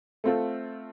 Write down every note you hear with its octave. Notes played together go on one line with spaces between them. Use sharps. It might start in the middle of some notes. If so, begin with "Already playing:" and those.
A3 C4 F4 A4